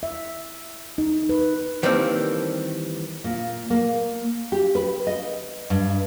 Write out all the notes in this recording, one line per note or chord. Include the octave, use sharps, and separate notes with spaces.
E5
D#4
B4
D#3 E3 G3 A#3 C4 D4
A#2
A#3
G4
B4
D#5
G2